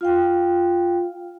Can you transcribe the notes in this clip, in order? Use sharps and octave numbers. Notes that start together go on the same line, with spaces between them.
F4 F5 G5